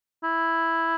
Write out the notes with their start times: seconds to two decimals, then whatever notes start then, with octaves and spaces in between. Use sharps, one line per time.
0.24 E4